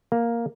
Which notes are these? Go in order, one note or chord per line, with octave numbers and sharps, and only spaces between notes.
A#3